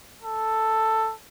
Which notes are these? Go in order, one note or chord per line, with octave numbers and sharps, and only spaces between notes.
A4